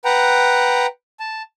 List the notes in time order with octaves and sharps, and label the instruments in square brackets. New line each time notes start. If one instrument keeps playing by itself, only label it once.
[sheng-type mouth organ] B4 F#5 G5 A#5
A5